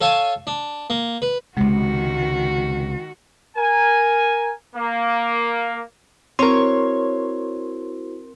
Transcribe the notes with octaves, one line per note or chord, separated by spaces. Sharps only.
A4 C#5 F5 G#5 A5
D4
A#3
B4
C#2 C3 D#3 G#3 F#4
A#4 G#5
A#3
C4 E4 F#4 A#4 C5 C#5 C6